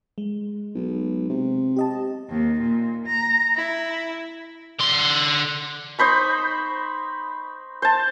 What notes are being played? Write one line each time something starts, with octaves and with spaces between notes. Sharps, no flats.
G#3
B1
C3
G4 D#5 A5
D#2
A#2
A#5
E4
D3 C6
D#4 C5 B5 C#6
C5 A5